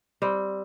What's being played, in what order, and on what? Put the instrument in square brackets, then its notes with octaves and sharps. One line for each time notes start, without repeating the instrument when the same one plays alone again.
[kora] G3 C4